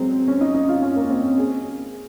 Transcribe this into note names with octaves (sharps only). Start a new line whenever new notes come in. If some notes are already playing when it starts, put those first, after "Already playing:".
Already playing: F#3 G#3 C4
C#4
D#4
D#4
F4
C#4
A#3
C4
C#4
G#4